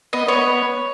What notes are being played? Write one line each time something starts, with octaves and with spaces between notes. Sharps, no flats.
B3 D#5
B3 C#5